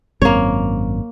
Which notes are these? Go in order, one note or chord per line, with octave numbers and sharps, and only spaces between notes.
G#1 F#2 A#3 C4 C#5